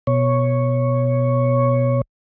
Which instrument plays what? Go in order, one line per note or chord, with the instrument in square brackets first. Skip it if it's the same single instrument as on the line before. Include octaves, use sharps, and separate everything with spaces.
[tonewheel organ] B2 C#5